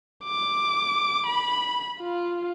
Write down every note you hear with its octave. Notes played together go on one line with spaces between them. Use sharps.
D6
B5
F4